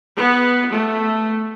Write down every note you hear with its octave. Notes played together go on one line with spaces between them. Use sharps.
B3
A3